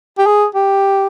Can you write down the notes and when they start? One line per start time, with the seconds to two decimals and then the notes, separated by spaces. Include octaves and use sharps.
0.18 G4
0.26 G#4
0.55 G4